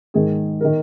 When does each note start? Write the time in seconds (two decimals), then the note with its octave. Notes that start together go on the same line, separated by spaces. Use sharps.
0.14 G#2 D#3 G#4
0.61 D#3 A#4